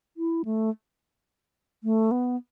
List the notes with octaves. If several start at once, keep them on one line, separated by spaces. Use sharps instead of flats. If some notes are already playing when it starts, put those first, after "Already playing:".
E4
A3
A3
B3